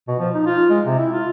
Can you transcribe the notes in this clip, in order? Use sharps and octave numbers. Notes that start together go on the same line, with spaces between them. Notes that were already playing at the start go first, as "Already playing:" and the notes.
B2
F3
D#4
F4
G#3
C3
E4
F4